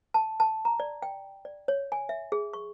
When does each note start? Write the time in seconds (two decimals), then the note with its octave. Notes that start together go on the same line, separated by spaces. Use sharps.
0.14 A5
0.40 A5
0.65 A#5
0.80 D5
1.02 G5
1.45 D5
1.68 C#5
1.92 G#5
2.09 E5
2.32 G#4
2.53 C#6